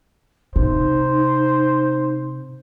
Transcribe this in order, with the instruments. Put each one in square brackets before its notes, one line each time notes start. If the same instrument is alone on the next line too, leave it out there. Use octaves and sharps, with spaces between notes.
[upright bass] C3 [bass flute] D#4 [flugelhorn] C5